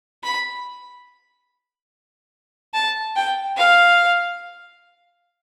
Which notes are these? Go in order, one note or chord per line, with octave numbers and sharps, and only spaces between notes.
B5
A5
G5
F5